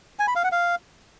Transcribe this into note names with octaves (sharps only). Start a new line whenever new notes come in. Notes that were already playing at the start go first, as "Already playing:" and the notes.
G#5
B5
F5
F#5
F5